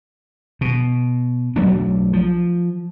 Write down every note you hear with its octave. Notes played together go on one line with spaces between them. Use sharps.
B2
B1 F#3 A3 D4
F3